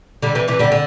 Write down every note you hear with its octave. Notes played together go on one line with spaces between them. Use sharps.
D3 G3
C3 E3
C3 E3
D3 G3
D3